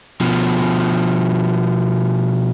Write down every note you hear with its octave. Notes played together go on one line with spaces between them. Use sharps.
B2 F3